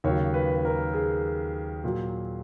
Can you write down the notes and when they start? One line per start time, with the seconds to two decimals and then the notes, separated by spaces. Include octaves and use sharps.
0.04 D#2 C#3 F#3 C#5
0.34 B4
0.55 B4
0.65 A#4
0.93 G#4
1.84 A#2 F#3